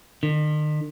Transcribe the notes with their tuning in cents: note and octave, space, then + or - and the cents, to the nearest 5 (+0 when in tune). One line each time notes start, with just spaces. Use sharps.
D#3 -45